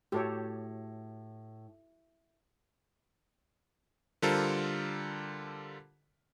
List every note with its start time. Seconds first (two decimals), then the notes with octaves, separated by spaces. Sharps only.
0.12 A2 F#4 G4 A4 C#5
4.22 D3 G3 F4 A4 A#4 C5